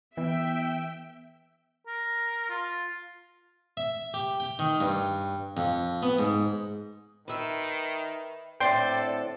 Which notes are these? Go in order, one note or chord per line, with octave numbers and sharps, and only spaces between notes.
E3 B3 E5 G5
A#4
F4
E5
G4
G5
D#3
G2
F2
B3
G#2
D#3 B4 E5
A2 D3 C4 A4 D5 G5 C6